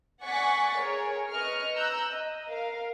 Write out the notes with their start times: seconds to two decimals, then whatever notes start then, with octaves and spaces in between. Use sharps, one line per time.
0.24 D5 F#5 G#5 C#6 A6 B6
0.77 G#4 A#4 C#5
1.30 B4 D#5 C#6 F6
1.76 A#5 E6 F#6 G6
2.09 D#5
2.48 A#4 F5